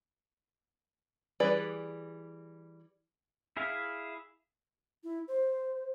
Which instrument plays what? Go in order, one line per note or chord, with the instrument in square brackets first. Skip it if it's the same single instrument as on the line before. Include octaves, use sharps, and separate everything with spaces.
[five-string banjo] E3 G3 G#4 B4 D5
[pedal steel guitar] E4 G#4 E5 F5
[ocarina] E4
C5